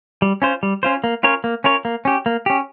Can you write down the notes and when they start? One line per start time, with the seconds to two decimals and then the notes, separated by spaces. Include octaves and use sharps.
0.22 G3
0.42 C#4 F4 C5
0.63 G3
0.83 C#4 F4 C5
1.04 A#3
1.23 C#4 F4 A#4 C#5
1.44 A#3
1.64 C#4 F4 A#4 C#5
1.85 A#3
2.05 C#4 G4
2.26 A#3
2.46 C#4 G4